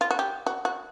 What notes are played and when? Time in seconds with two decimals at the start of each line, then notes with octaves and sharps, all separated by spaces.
0.01 F4
0.11 F#4
0.19 G4
0.47 F#4
0.65 F#4